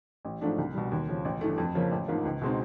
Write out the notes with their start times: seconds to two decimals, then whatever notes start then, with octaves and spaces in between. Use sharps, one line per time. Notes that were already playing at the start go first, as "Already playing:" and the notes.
0.25 A1
0.41 G#2 F3 A3 D4
0.58 C2
0.75 B2 G3
0.92 D#2
1.08 C#3 F3
1.25 A1
1.41 G2 E3 A3
1.58 F2
1.75 C#3 F3 A#3
1.91 A1
2.08 G#2 F3 A#3
2.25 C#2
2.42 B2 G#3 C4 D#4